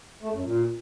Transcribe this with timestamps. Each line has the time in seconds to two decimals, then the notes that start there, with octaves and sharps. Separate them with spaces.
0.22 A3
0.33 F#2
0.44 A#2